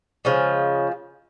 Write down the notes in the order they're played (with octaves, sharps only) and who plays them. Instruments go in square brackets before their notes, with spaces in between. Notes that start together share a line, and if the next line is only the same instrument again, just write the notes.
[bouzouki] C#3 F3 G#3